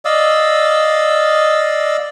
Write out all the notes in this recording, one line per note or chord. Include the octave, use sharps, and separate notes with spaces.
D5 D#5 F5 E6